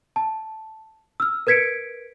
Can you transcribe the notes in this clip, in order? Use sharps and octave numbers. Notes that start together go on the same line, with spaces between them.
A5
E6 F6
A#4 B4 G#6 B6 C#7 D7